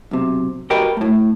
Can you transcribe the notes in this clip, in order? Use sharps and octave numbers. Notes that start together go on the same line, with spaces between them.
B1 C3
F#4 G4 A#4 B4 D#5 G5
A2 A3